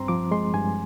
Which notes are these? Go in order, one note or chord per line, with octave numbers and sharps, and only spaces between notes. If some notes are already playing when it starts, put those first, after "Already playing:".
Already playing: G2 C4 A#5 C6
F3 D6
G#3 C6
G2 G#5